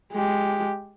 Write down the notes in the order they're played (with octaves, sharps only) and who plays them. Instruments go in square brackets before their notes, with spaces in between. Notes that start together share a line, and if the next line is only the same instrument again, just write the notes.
[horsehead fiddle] G#3 G4